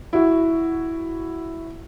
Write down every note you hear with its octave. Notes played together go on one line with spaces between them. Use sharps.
E4 F#4